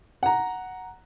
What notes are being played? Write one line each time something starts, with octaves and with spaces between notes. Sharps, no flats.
F#5 A#5